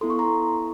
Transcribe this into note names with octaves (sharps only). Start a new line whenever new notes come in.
B3 E4 A4 C6
C#6
A#5 C6